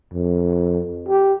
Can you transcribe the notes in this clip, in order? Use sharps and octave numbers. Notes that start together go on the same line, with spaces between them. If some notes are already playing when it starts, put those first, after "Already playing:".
F2
G4